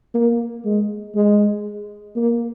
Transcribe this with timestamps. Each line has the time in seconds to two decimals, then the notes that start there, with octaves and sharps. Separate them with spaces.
0.14 A#3
0.65 G#3
1.15 G#3
2.16 A#3